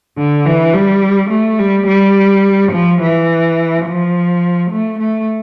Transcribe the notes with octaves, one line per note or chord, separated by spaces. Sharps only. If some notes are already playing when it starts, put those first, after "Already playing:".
D3
E3
G3
A3
G3
G3
F3
E3
F3
A3
A3